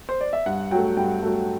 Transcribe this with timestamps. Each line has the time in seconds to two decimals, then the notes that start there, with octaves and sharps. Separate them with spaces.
0.09 C5
0.21 D5
0.33 E5
0.46 G2 F#5
0.71 F#3 A3 G5
0.97 G2 G5
1.22 F#3 A3